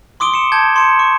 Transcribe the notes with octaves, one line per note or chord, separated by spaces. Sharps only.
C6 D6 D#6 D7 G7
C#7 E7
A5 G6 G#6
C6 C#7 E7
C#6